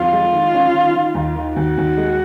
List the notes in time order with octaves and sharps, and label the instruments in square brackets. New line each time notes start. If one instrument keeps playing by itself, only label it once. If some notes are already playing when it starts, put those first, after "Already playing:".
Already playing: [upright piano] F2 [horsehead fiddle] F4
[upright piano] G#3
D#3
C#4
D#3
D#3
D#2
D#3
[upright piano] D#2 [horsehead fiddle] F#4
[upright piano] D#2
G#3